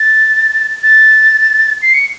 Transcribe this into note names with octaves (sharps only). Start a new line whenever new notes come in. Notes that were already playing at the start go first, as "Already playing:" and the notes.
Already playing: A6
A6
C7
C#7